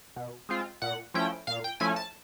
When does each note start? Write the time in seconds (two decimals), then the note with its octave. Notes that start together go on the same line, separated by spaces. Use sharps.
0.16 B2
0.49 G#3 C4 F4
0.82 A#2 F#5
1.14 F3 A3 C#4 E4 G5
1.47 A#2 F5
1.64 G5
1.80 F3 A3 C#4 E4 G#5
1.96 A5